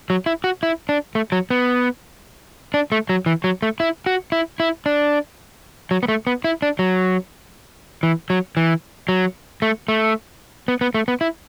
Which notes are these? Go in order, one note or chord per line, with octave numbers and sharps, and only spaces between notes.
F#3
E4
F#4
E4
D4
A3
F#3
B3
D4
A3
F#3
E3
F#3
A3
E4
F#4
E4
E4
D4
F#3
B3
A3
B3
E4
D4
F#3
E3
F#3
E3
F#3
A3
A3
B3
B3
A3
B3
E4